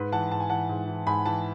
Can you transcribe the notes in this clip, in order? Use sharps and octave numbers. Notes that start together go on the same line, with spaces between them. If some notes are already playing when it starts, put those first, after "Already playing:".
Already playing: G#2 B4
E3 F#5 A5
G#2 A5
G#5
E3 F#5 A5
G#2
E3
G#2 G#5 B5
E3 F#5 A5